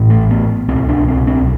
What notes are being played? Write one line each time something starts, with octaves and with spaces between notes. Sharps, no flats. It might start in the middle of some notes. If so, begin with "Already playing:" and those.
Already playing: A1 A2
A3
B3
C2 B2 C4
D4
C4
C4